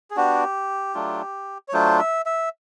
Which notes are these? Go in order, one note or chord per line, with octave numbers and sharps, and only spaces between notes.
G#4
B3 D4 F#4 G4
F#3 A3 D4 F4
C#5
F#3 A3 D4 F4 C5
E5
E5